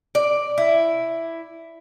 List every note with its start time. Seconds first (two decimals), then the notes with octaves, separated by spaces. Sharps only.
0.15 D5
0.58 E4